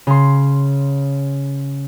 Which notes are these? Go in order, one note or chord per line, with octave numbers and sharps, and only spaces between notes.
C#3 C6